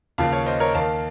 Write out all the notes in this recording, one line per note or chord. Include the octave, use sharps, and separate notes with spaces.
D#2 C#3 F3 F5 A5
C#5 F5
C5 D#5
A#4 C#5
D#2 D#3 F5 A5